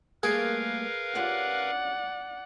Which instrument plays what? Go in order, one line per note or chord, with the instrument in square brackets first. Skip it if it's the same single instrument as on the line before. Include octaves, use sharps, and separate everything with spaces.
[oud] G3 A3 A#3 [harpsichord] G#4 [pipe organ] A#4 B4 F5
[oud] C#4 F4 G4 [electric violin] D5 F#5